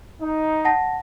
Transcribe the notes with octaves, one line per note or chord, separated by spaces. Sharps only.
D#4
F#5 A5 A#6